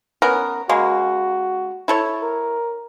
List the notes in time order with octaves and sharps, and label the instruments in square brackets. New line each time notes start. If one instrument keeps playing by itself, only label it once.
[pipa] B3 C#4 A#4
[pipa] C#3 G#3 A#3 [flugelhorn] F#4
[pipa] E4 A4 C#5
[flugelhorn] A#4